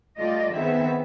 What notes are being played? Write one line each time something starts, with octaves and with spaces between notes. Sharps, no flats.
G3 A3 F4 D5 D#5
D#3 B3 C4 G#4 E5